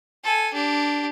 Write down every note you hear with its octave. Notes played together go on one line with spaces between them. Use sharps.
A4 G#5
D4 G4